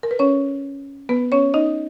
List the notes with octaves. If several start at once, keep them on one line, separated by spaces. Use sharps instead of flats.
A#4
B4
C#4 C#5
B3 B4
C#4 C#5
D#4 D#5